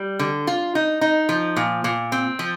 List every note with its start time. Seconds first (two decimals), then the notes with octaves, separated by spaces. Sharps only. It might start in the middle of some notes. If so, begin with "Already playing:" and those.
Already playing: G3
0.19 D3
0.47 F4
0.75 D#4
1.01 D#4
1.29 F3
1.56 A#2
1.84 A#2
2.12 C4
2.39 F3